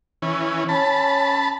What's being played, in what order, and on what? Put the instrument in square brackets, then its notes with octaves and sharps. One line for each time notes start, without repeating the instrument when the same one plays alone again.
[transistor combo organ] E3 C#4
[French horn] C#4 [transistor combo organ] A5 B5